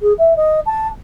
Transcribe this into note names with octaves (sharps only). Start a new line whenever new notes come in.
G#4
E5
D#5
A5